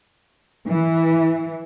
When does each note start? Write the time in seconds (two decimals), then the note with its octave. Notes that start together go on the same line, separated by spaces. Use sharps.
0.67 E3